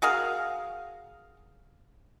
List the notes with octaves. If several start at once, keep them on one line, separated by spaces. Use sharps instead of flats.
F#4 G#4 A#4 F5